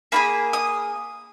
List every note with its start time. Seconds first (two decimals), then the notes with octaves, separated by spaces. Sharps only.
0.12 A#3 F4 G#4 B5
0.53 D#6